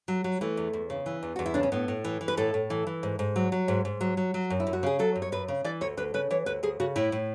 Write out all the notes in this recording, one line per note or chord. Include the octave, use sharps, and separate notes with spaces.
F#3
F#3
E3 A3
E2
E2
C#3
E3
E2
E2 F#4
E4
C#3 D4
C#4
A2 B3
A2
E3
E3
B4
A2 A4
A2
E3
E3
G#2
G#2
F#3
F#3
G#2
G#2
F#3
F#3
F#3
F#2
E4
F#2
F#4
C#3 G#4
F#3 A4
F#2
C#5
F#2 B4
C#3
E3 D5
D2 C#5
D2 B4
C#3 B4
E3 C#5
D2 B4
D2 G#4
C#3 F#4
A2 E4
A2